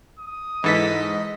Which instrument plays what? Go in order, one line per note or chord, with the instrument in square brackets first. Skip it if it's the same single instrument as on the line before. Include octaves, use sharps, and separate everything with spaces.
[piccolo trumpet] D#6
[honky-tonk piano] G#2 [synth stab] E3 A4 B6 [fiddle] D#5